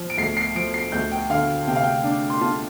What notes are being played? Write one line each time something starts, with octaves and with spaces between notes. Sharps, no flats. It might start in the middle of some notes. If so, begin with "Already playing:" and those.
Already playing: F3
D7
D2 C7
C7
F3 D7
C7
D2 G6
G5
D3 F5
C3 G5
F5
G5
D4
C6
F4 A5